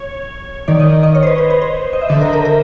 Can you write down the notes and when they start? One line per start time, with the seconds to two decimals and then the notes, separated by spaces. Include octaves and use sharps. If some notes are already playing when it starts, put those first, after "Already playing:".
Already playing: C#5
0.68 D#3 D5
0.80 D#5
1.03 D#5
1.15 C#5
1.23 C5
1.27 B4
1.38 B4
1.50 C5
1.62 C5
1.93 D#5
2.02 E5
2.09 D3 D#5
2.21 A#4
2.33 A#4
2.45 A#4